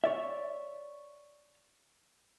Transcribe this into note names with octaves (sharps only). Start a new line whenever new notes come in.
C#5 D5 E5